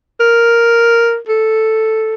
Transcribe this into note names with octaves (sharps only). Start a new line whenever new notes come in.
A#4
A4